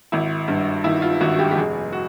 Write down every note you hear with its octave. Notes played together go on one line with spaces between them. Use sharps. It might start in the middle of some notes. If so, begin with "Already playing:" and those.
G#1 E4
G2
D#3 E4
F4
G#1 F#4
G4
G4
F1 G#4
F#4